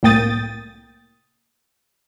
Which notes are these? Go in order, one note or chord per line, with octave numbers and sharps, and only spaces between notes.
C2 A2 A#3 G5 D#6 A6